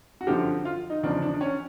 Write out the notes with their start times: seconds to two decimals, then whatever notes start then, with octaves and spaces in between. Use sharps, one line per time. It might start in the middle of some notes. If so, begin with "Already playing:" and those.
0.21 F#4
0.27 F#2 D3 F3 G4
0.65 F4
0.90 D#4
1.03 E2 C#3 F3 D4
1.22 D4
1.34 D4
1.41 C#4